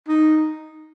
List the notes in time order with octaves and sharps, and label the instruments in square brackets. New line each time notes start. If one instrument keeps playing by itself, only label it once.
[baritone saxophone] D#4